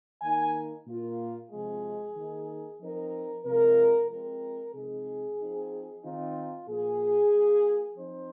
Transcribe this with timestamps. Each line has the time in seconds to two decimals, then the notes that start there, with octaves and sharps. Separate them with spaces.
0.22 D#3 A#3 D#4 G#5
0.87 A#2 A#3 F4
1.51 C3 F3 G#3 G#4
2.16 D#3 A#3 D#4
2.80 F3 C4 D#4 A#4
3.45 C3 F3 G#3 F4 A#4
4.10 F3 G#3 C4 F4 A#4
4.74 C3 F3 G#3 D#4 G#4
5.39 F3 C4 D#4
6.04 D#3 C4 D#4 F4
6.68 A#2 F3 A#3 F4 G#4
7.33 F3 A#3 F4
7.98 F3 C4 D#4 C5